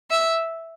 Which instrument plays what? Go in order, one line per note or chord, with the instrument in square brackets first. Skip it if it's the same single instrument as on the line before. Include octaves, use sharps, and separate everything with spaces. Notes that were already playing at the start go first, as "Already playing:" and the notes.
[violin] E5